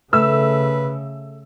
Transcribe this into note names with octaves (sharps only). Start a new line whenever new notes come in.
C#3 A3 B4 E6